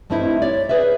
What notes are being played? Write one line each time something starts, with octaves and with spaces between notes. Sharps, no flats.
G2 A3 C4 D#4 E4
C#5 D5
G#4 B4 D5 E5